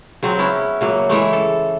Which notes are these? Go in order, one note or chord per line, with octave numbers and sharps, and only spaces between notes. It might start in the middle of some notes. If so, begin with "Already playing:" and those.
C#3 F#3 C4
B3 C#4 E4
C#3 F#3 A#3
E3 G#3 A3
A4